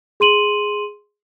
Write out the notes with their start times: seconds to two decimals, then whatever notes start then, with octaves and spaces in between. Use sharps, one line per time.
0.20 G#4 C6 D#7 F#7